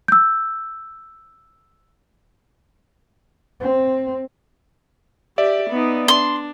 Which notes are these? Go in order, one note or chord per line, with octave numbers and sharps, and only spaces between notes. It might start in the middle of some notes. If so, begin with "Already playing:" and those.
E6 G6
C4
G4 D5 E5
B3 D#4
D4 C6